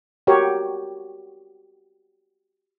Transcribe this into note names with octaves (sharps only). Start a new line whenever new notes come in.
F#4 G4 A#4 C#5